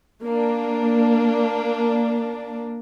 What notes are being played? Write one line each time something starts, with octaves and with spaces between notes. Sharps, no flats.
A#3 D4